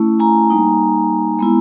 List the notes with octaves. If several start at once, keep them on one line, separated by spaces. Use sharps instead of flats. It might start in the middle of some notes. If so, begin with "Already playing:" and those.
Already playing: A3 C#4 E4
G#5 A#5
G3 A#3 D#4
G#3 B3 E4